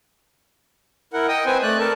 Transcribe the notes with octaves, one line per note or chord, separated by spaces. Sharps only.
E4 A#4 F#5
D#5 G5 D#6
C4 B4 C5 G#5
A3 D5 F#6
A4 A#4 A5